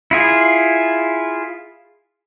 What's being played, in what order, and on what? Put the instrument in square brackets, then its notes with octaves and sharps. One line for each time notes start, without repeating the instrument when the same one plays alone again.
[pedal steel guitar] E4 F4 G#4